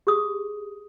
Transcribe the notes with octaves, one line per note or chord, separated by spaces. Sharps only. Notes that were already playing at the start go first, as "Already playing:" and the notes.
G4 G#4 D#6